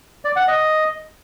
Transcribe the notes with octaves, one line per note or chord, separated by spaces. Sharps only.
D5
F#5
D#5